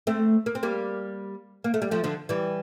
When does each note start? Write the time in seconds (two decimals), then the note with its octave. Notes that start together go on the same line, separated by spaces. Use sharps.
0.07 A3 C4
0.46 A#3
0.55 C4
0.63 G3 A#3
1.64 A#3
1.74 A3
1.82 G3
1.91 F3 A3
2.04 D3 F3
2.29 E3 G3